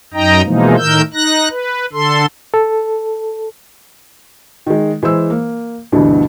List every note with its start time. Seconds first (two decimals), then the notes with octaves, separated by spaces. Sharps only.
0.14 F#2 D#4 D#5 G5 A#5
0.45 B2 E3 F3 G#3 A#3 D#4
0.78 A2 D#3 A#4 E6 G6
1.14 D#4 F#6 A#6
1.51 B4
1.93 D3 A4 C6
2.54 A4
4.66 D#3 G#3
5.03 E3 G#3 C5 E6
5.30 A#3
5.92 D2 G2 B2 D3 E3